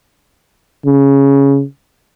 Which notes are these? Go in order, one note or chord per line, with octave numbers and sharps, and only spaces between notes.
C#3